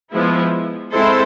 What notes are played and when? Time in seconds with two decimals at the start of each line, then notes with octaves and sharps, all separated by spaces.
0.13 F3 G#3 B3 E4
0.92 G#3 C4 E4 A4 C5